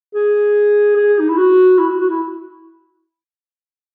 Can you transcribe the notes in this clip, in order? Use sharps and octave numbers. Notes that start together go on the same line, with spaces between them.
G#4
G#4
D#4
E4
F#4
E4
F#4
F#4
E4